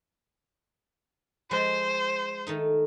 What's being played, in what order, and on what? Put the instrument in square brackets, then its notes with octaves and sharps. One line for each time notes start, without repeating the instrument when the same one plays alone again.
[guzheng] F3 G#3 [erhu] C5
[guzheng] D#3 A3 D#4